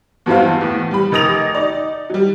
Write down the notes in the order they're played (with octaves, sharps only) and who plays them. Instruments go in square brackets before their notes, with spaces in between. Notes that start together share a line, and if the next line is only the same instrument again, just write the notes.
[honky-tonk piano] E2 G2 F#3 C4 E4 F5
E2 A2
G3 B5
F1 D#4 A#4 D#6 A#6 F7
D#4 D5
F#3 G3